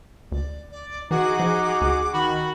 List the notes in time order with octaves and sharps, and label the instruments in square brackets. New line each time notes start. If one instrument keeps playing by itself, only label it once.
[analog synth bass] D2 [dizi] D5
[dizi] D5
[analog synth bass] E3 [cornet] D#4 [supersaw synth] F#4 G#4 F#5 [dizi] D6
[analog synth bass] F3
D2
[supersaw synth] D#3 [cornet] F#4 [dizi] B5